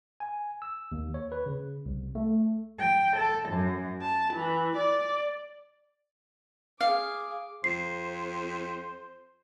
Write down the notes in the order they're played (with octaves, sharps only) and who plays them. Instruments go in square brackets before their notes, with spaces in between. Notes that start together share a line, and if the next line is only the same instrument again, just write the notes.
[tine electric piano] G#5
E6
D#2
C#5
B4
C#3
C2
A3
[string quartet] G5
A4
F#2
A5
E3
D5
[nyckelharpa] G#4 D6 [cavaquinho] F5
[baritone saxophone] F2 [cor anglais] C5 [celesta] C7